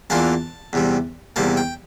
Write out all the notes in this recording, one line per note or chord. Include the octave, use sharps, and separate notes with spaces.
E2 E3 A#3 D4 F4 A5
E2 C3 G3
E2 C3 G3 A#3 A5
G5